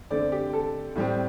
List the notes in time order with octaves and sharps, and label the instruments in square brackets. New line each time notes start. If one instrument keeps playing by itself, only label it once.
[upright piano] D3 A3 C4 D5
G4
A4
A2 G3 C4